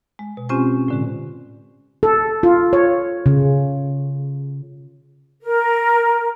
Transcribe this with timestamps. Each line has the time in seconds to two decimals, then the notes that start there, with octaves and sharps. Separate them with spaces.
0.19 G#3
0.37 B2
0.49 C4 C#4 F4 G4 C5 G#5
0.88 A2 D3 G#3
2.03 A4
2.43 F4
2.73 C#5
3.26 C#3
5.42 A#4